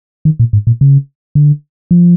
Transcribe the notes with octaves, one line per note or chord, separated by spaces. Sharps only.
D#3
A#2
G#2
A#2
C#3
D3
F3